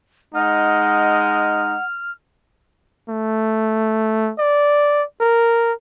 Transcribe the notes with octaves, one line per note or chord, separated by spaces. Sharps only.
G#3 D#4 F#5 F6
A3
D5
A#4